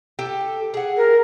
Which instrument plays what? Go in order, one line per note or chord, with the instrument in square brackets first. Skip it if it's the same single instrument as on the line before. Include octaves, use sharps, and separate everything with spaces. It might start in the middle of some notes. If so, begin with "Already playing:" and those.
[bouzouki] G4 A4
G#4 F#5
[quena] A#4